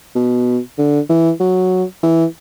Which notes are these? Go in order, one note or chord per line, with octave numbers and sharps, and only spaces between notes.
B2
D3
E3
F#3
E3